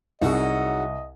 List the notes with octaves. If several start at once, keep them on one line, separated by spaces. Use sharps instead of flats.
C2 F#2 D#4 F#4 G#4 D#5